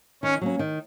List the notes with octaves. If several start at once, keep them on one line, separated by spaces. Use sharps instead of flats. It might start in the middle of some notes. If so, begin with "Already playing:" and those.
D#3 C#4
F#3 A#3 C#4
D#3